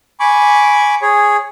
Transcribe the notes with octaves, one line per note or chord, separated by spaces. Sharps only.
G#5 B5 C#6 D6
G#4 C#5